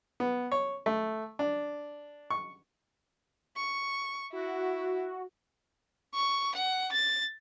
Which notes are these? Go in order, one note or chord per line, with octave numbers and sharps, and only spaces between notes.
B3
C#5
A3
D4
C#6
C#6
E4 F#4
C#6
F#5
A6